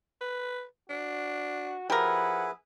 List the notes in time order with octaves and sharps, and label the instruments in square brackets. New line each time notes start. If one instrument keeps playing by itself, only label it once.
[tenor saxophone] B4
[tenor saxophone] D4 [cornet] F#4
[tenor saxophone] F3 [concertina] E4 G#4 B4 [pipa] G4 A#4 [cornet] F#5